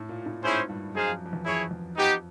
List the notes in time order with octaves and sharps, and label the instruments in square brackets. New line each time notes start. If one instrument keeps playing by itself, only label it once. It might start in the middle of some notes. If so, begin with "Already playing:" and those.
Already playing: [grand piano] A2
A#2
A2
[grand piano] G#2 [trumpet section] C#4 E4 G#4 C5
[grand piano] G2
[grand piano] F#2 [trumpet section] D#4 G#4 C5 F5
[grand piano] F2
F2
E2
[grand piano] F2 [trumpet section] E4 G#4 C#5
[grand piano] E2
[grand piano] F2 [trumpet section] B3 D#4 G4